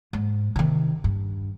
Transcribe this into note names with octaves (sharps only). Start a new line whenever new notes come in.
G#2
C3 D#3
G2